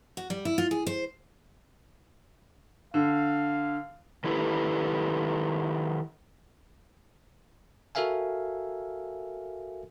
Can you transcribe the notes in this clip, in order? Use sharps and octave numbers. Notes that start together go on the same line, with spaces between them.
F#4
G3
E4
F4
G#4
C5
D3 F5
D#3 E4 G4 A4 B4
F#4 A4 A#4 E5 F5 G#5